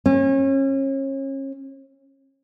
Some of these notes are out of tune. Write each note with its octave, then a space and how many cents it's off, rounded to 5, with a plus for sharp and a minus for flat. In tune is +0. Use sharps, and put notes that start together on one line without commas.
C#4 -35